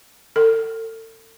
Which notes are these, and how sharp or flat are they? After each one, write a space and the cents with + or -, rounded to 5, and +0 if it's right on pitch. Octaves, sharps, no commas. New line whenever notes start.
A4 +35